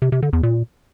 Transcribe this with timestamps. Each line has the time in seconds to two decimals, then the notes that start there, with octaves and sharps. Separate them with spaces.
0.02 C3
0.12 C3
0.22 D3
0.33 E2
0.43 A#2